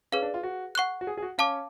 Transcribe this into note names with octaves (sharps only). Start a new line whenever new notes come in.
C#4 G#4 B4 F5
D4
F4
F#4
F#5 C#6 F#6
F#4
G#4
G#4
F#4
C#4 F5 A5 D6